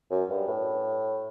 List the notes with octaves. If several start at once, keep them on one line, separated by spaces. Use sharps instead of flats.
F#2
G2
A2